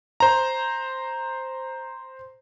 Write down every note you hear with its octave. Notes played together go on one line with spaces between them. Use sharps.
C5 A#5